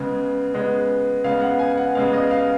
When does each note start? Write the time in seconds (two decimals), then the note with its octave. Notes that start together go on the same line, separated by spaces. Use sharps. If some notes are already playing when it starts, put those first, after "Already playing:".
Already playing: C#3 G#3 B3
0.54 C#3 G#3 B3
1.24 C#3 G#3 B3 F5
1.42 F#5
1.59 G#5
1.77 F#5
1.95 C#3 G#3 B3 F5
2.13 D#5
2.31 F5